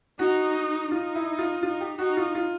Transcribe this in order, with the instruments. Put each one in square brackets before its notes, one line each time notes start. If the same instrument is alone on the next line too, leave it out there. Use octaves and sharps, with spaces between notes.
[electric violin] D#4 [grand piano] F#4
[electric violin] D#4 [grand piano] F4
[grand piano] E4
F4
[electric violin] D#4 [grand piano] F4
[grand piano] G4
[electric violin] D#4 [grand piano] F#4
[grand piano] F4
F4